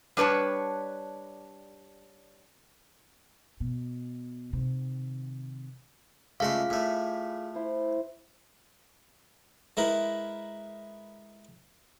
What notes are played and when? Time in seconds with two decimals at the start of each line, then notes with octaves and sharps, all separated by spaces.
0.17 G3 D4 B4 C#5 A5
3.60 B2
4.53 C3 D#3
6.40 C#2 A3 F4 G#4 F5 C6
6.70 A2 A3
7.55 E4 C5
9.77 G#3 E4 A#4 B4